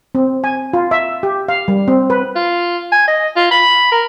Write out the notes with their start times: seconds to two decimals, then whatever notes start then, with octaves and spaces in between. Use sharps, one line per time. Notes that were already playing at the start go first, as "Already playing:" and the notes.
0.15 C4
0.44 G#5
0.73 F4
0.91 E5
1.23 G4
1.48 F5
1.68 G3
1.88 C4
2.10 B4
2.35 F4
2.92 G#5
3.08 D#5
3.36 F4
3.51 B5
3.92 A#4